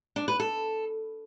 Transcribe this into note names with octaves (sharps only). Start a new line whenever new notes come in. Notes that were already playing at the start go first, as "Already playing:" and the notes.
D4
B4
A4